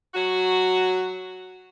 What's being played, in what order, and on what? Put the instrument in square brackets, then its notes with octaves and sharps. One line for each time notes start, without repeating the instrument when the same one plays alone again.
[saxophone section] F#3 F#4